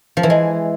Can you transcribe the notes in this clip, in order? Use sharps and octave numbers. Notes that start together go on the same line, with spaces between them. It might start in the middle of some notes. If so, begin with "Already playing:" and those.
F3
E3
G#3